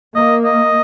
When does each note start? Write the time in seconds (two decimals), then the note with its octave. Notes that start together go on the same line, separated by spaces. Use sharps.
0.15 A#3 D#5
0.45 D#5